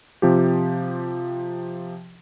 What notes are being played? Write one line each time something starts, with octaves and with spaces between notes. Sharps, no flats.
C3 F3 G4